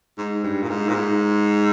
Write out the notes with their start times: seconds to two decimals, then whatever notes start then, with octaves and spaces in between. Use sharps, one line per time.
0.18 G#2
0.44 G2
0.63 A#2
0.69 G#2
0.89 A#2
0.95 G#2